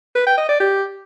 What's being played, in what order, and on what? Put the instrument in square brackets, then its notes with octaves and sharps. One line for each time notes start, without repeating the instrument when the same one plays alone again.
[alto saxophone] B4
G5
D#5
D5
G4